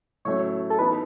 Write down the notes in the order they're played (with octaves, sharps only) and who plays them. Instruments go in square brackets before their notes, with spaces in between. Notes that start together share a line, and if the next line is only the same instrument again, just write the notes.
[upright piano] A2 F#3 A3 C#4 [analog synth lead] C#5
[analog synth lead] A4
[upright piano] E3 B3 D#4 [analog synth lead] B4